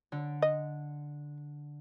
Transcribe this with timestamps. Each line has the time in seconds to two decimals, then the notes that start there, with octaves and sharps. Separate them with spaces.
0.12 D3
0.42 D#5